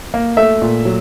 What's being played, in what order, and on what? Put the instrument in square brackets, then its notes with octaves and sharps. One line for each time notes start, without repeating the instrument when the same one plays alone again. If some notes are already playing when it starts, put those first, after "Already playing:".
[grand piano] A#3
[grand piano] A3 [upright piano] E5
[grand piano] A#2
F#3